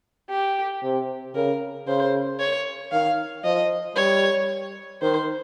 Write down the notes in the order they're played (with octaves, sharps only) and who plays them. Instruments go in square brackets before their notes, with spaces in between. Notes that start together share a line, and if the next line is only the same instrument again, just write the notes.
[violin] G4
[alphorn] C3
[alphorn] C#3 [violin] A#4
[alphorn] C#3 [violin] C5
[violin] C#5
[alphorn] D#3 [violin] F5
[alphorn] F3 [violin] D#5
[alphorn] G3 [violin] C#5
[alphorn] D#3 [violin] C5